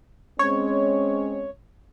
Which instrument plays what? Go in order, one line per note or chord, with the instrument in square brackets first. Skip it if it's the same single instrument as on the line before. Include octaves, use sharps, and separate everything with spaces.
[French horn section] G#3 C4 C#4 [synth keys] C#5